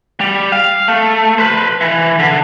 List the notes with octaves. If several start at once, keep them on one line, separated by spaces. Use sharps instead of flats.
G3
F5
A3
B4 C5
E3
D3